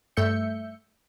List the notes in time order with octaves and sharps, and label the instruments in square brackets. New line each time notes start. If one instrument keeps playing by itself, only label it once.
[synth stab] G2 A3 E5 G6 C#7